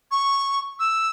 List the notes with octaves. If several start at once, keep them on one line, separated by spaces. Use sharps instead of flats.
C#6
E6